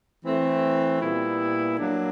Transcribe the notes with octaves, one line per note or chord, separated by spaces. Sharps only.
E3 A3 C4
A#2 G3 B3 E4
F#3 A#3 D4